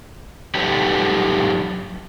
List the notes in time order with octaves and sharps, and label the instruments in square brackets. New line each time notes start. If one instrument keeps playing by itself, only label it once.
[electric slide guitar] F#3 D#4 G4 A4 B4 C#5